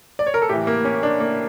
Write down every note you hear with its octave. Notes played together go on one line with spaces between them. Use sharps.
D5
C#5
A#4
A4
A2 E3 G4
A#3
C#4
D4
A#3